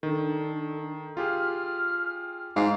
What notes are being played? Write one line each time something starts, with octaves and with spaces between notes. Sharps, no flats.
D#3 D4 A4
F4 G4 G#4 F6
G#2 F5 C7